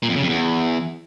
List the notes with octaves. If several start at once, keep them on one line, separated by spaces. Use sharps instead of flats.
A#2
F2
C#3
F2
E2